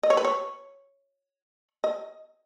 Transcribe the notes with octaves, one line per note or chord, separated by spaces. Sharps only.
D#5
C#5
B4
C#5
D#5